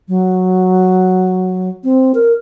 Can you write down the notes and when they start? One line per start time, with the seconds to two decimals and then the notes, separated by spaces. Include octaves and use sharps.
0.08 F#3
1.84 C4
2.15 A#4